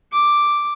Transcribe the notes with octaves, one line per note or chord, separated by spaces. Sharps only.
D6